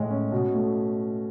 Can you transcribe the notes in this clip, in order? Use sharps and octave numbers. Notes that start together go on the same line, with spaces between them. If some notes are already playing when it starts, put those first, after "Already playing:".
Already playing: A2 G#3
C#4
B2
A3